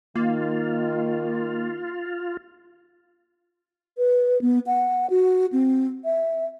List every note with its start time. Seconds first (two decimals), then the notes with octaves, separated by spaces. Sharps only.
0.16 D#3 A#3 F4
3.98 B4
4.41 B3
4.66 F#5
5.10 F#4
5.52 C4
6.05 E5